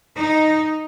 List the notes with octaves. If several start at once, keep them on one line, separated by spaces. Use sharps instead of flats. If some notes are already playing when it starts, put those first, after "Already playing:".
D#4